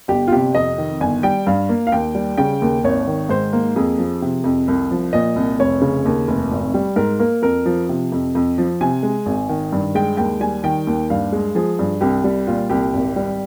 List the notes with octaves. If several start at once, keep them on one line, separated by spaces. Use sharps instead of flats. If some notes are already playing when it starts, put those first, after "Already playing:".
G1 G4
F4
C3 G4
F2 D#5
D#3
G1 G#5
G3 G5
G2 F5
A#3
F5
D#2 G5
G3
C#3 G5
D#2
G#1 C#5
D#3
G#2 C5
A#3
F2 G#4
F3
C3
F2
C2
F3
A#2 D#5
C2
F1 C#5
C#3
D#2
F1
G#1
G3
G#2 A#4
A#3 A#4
F2 A#4
F3
C3
F2
F2
F3
C3 G#5
G#3
G#1
D#3
G2
G#3 G5
D#2 G5
G3 G#5
D#3 G5
D#2
G2 F5
G#3
F3 G#4
G2
C2 G4
G3
A#2 F4
C2 G4
G#1
G3